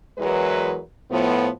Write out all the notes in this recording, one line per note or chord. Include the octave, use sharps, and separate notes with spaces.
E2 E3 F#3 G#3 A#4 B4
A2 F3 B3